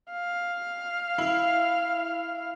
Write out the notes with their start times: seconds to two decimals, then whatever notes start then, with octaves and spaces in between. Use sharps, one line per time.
0.11 F5
1.18 E4